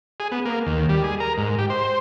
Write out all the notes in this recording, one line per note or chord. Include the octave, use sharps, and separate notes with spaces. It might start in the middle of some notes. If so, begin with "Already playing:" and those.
G#4
B3
A#3
D#2
G3
G#4
A#4
G#2
G4
C5